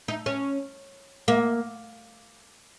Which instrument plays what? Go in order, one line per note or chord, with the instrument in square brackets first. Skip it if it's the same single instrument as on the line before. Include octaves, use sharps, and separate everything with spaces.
[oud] D#4
C#4
A#3